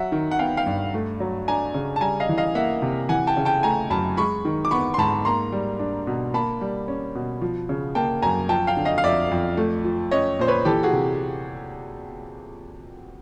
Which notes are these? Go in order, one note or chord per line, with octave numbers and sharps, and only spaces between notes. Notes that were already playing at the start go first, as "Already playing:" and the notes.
Already playing: F#3 E5 F#5
D#3
F#5
B3 F5 G5
F5 G5
G2
A3
F#3
D4 G#5 A#5
C#3
A5
G3 G#5 A#5
D#5 F5
E3
D#5 F5
A#3 E5 F#5
C3
E3 F#5 G#5
G5 A5
C#3
G5 A5
A3 G#5 A#5
F#2 A5 B5
G#3 B5 C#6
D#3
D6
B3 B5 C#6
C6
G#2 A5 B5
A#3 A#5 C6
G3
D4
B2
A#3 A5 B5
G3
C#4
B2
F3
C#3
A#3 G5 A5
F#2 G#5 A#5
F3 G5 A5
F5 G5
D3
D#5 F5
F5
F2 D5 E5
F2
A3
F3
C#4 C#5 D#5
A#2 C5
B4 C#5
E3 G4 A4
F#4 G#4
C3